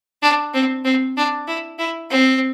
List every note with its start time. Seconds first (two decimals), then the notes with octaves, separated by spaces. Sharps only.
0.22 D4
0.54 C4
0.85 C4
1.17 D4
1.48 E4
1.79 E4
2.10 C4